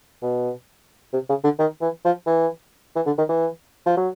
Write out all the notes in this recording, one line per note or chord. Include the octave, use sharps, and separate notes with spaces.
B2
C3
C#3
D3
D#3
E3
F3
E3
E3
D3
D#3
E3
F3
F#3